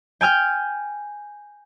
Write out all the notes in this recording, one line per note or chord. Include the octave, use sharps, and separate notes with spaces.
G5 G#5 F6 G6